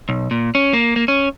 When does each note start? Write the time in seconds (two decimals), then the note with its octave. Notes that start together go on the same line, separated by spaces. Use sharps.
0.09 B1
0.31 A#2
0.55 C#4
0.73 A#3
0.96 A#3
1.08 C#4